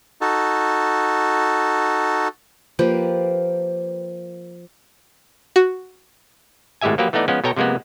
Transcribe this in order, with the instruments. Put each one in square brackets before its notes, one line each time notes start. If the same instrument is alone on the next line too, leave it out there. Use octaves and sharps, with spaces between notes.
[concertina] D#4 F#4 A4
[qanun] F3 A#3 G4 B4
[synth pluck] F#4
[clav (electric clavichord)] G#1 A2 G#3 G4 E5 G#5
F3 F#3 A#3 G4 B4
E3 A3 B3 D#4 D5
F3 G#3 B3 C#4
B2 A4 C#5 G5 A#5
C3 F3 G#3 A#3 B3